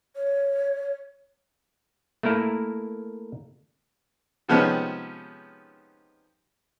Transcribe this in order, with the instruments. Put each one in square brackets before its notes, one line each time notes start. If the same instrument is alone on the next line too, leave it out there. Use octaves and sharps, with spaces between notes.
[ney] C#5
[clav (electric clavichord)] A3 A#3 E4 A#4
[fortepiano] C3 D#3 F3 G#3 B3 C#4